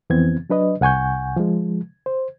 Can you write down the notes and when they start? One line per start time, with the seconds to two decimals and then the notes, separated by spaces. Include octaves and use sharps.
0.10 F2 E3 B3 C4 G#6
0.50 F#3 D4 B4 D#5
0.81 C2 F#5 G#5 C#6 G6
1.36 F3 G#3
2.06 C5